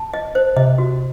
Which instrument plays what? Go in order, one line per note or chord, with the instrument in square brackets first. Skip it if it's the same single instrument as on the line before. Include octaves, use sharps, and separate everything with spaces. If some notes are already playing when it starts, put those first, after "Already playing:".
Already playing: [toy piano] A5
D#5
C5
[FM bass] C3 [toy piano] D#5
[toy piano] F#4